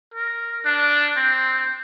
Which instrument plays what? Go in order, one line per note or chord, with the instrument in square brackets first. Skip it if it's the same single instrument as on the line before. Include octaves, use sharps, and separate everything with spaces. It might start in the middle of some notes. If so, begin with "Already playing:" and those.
[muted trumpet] A#4
D4
C4